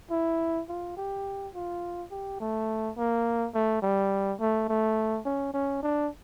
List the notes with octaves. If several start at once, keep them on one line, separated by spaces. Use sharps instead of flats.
E4
F4
G4
F4
G4
A3
A#3
A3
G3
A3
A3
C#4
C#4
D4